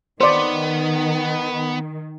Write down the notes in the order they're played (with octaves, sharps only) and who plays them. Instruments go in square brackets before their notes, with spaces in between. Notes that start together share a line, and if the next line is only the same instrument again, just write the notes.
[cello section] D#3 [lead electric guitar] B3 [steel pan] C5 D5